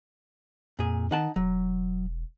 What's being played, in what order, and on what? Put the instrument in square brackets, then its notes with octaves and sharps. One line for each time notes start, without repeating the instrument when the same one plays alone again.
[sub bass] F2 [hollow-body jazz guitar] A#2 G#4
[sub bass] D#3 [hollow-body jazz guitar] D#4 F#5 A5
[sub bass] E1 [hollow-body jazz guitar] F#3